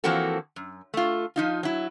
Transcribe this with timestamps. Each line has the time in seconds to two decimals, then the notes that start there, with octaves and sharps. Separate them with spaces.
0.04 E3 F3 A#3 C4 F#4 A4
0.56 F#2
0.94 A3 F4
1.36 F3 D#4 F4
1.63 F#3 E4